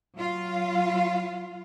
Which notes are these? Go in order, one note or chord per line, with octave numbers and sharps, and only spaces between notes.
F#3 F4 F5